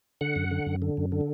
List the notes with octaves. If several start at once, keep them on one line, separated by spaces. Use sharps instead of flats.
D3 F#5
F#2
D3
F#2
D3
F#2
D3